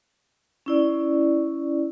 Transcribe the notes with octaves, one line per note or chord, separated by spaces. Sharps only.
C#4 E4 D5